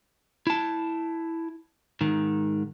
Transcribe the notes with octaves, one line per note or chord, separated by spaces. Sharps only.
E4 A5
G#2 D#3